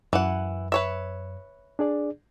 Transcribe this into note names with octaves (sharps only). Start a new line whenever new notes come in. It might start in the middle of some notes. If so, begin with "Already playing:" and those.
F#2 E3 F#5
B4 C#5 E5
D4 G#4 D5